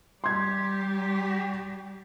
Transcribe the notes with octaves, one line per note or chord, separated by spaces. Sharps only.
G3 G4 C6 G#6